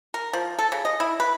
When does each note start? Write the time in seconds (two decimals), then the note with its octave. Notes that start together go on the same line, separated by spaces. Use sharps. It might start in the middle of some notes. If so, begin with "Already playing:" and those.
0.14 A#4
0.33 F3
0.59 A4
0.72 C#3
0.85 D#5
1.00 E4
1.20 B4